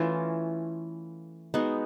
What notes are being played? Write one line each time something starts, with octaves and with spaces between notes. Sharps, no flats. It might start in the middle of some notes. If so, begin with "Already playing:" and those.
Already playing: E3 A3 C#4 F4
G#3 B3 D#4 F#4